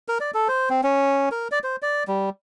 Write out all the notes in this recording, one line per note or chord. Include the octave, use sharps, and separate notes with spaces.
A#4
D5
A4
C5
C4
C#4
A#4
D5
C5
D5
G3